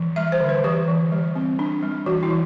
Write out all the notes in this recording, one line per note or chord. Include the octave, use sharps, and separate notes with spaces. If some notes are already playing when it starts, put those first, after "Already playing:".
Already playing: E3
G3 E5
C5
D3
B4
E3 G4
E3
G3
C4
D4
G3
E3 F#4
E4
E3